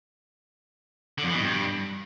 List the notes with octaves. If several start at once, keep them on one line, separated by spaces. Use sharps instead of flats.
D3
F2
E3
B2
G2